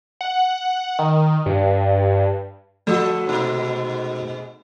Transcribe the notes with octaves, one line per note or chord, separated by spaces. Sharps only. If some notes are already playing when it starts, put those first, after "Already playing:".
F#5
D#3
G2
F3 A3 F#4 A4
G#2 B2